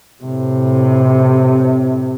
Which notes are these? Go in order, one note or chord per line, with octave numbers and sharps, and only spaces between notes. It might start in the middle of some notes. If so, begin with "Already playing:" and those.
A2 C3